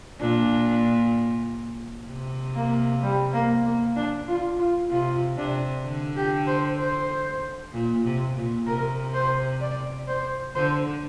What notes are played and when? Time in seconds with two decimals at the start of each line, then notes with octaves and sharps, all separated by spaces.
0.20 A#2 D4
2.08 C3
2.56 A#3
3.03 G3
3.33 A#3
3.65 A#3
3.96 D4
4.28 F4
4.59 F4
4.90 C3 F4
5.37 C3 D4
5.85 D3
6.17 G4
6.47 C5
6.79 C5
7.73 A#2
8.04 C3
8.36 A#2
8.66 C3 A#4
9.14 C5
9.61 D5
10.08 C5
10.55 D3 C5